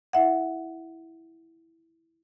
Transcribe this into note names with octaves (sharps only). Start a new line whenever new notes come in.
E4 E5 F#5